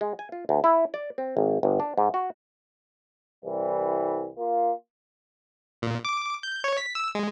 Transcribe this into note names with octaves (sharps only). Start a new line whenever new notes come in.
G#3
G#5
F4
D2
E4
D5
C4
G#1
G1
D4
G#2
F#4
C2 E3 G3
A#3 F4
A#2
D6
G6
C#5
B6
E6
G#3